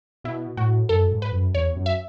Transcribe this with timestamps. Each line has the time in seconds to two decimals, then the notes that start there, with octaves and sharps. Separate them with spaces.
0.24 B2 E4
0.57 A2 F#4
0.89 F#2 A4
1.12 G#2
1.22 B4
1.32 F#2
1.54 E2 C#5
1.76 F#2
1.86 E5